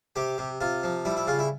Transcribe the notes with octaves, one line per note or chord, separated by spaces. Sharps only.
C3 G4
C3
C3 F4
F3
G3 E4
E4
C#3 F4
E4